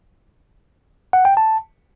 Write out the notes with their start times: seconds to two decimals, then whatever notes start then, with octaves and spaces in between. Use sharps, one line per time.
1.13 F#5
1.25 G5
1.37 A5